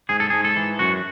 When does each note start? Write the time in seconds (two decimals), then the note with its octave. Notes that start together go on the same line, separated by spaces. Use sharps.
0.09 G#2 G#4
0.20 A4
0.30 G#2 G#4
0.45 A4
0.56 E3
0.79 F#2 F#4